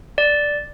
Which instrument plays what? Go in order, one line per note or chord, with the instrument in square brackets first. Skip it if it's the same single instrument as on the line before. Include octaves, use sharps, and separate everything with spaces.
[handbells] D5